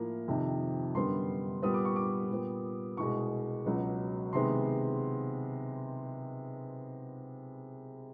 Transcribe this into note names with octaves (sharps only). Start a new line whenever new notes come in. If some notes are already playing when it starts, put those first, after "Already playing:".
Already playing: A2 F3 A#3
F2 C3 D#3
F#2 D3 G3 B3 C6
A#2 G3 B3 D#6
D6
C#6
D6
A#2 G3 B3
C2 B2 G#3 C#6
C#2 B2 F#3
C3 D#3 G#3 B3 C6